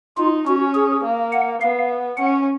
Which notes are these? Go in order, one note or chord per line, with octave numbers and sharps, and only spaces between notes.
D#4 F4
C#4 F#4
G#4
A#3
F#5
B3 F5
C#4 F#5